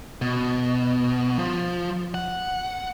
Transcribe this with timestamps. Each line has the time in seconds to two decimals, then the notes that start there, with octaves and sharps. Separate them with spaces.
0.22 B2
1.39 F3
2.14 F#5